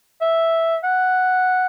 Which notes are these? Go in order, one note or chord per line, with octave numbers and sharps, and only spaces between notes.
E5
F#5